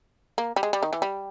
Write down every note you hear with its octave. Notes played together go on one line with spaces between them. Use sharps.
A#3
G3
G#3
G3
D#3
E3
G3